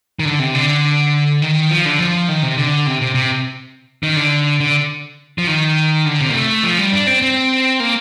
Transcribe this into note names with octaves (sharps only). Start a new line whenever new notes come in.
D#3
D3
C3
D3
D#3
F3
D3
F3
D#3
C3
D3
C3
C3
C3
D#3
D3
D3
F3
D#3
D3
C3
A#3
A3
F3
G3
D4
C4
C4
A#3